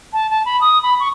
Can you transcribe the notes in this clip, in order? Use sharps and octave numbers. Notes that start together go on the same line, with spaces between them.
A5
A5
B5
D#6
B5
C#6